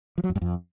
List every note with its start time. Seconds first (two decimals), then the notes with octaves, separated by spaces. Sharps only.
0.18 F3
0.24 F#3
0.30 F2
0.36 G2
0.41 F2